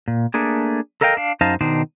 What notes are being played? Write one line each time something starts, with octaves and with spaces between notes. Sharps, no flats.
A#2
A3 A#3 D4 G#4
A4 A#4 D#5 F5 G5
D4 F5
F#2 D#4 C5 D#5 F5 A5
B2 D#3 D4 D#4 C5